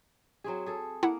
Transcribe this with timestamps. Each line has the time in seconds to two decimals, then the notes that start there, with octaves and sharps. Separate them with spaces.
0.44 F#3 C4 G#4
0.66 G#4 A4
1.03 A#3 E4 F#5